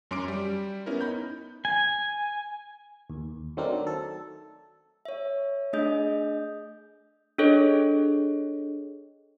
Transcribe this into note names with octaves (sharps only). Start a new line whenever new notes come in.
F#2 C#4 C6 D6 D7
G3
B3 C#4 E4 A#4
D#4 B5 G6
G#5
D#2
D#3 F#3 A3 C4 D4 A#4
A4
C#5 E5
A3 D4 G#4 D#5 D#6 G6
D4 G#4 A4 C#5 D#5